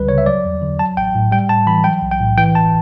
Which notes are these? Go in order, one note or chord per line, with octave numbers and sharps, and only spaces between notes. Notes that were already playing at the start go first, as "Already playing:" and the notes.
Already playing: C#2 D3 G3 B4
C#3 C#5
E5
F#3 D5
E2
D3
F#3 A5
A1 G5
A2
G3 G5
A2 A5
E3 B5
F#3 G5
B1
G5
A2
E3 G5
G1 A5